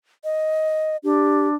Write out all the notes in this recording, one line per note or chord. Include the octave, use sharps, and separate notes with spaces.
D#5
D4 G4